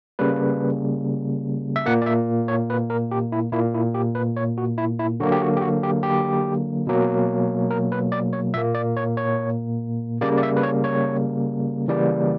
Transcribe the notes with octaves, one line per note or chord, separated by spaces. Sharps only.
C#3 G3 A#3 B4
E5
A#2 A#3 F#5
D5
E5
C#5
B4
A#4
G4
E4
A#2 A#3 E4
E4
G4
B4
C#5
F#4
E4
E4
D3 F#3 A#3 F#4
G4
F#4
G4
F#4
G4
G4
B2 F#3 A#3
A#4
B4
D5
C#5
A#2 A#3 E5
D5
C#5
C#5
C#3 G3 A#3 D5
D5
E5
B4
C#5
C#5
C#3 E3 G3 A#3 D5